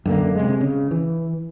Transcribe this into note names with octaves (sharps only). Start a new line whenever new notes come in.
F#2 D3 A#3
C3 G#3
C#3
E3